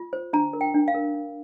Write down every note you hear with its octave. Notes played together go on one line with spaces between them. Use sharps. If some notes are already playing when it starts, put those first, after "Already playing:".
Already playing: F4
C5
D4 A#5
A#4
G5
D4
F5
A#4
D4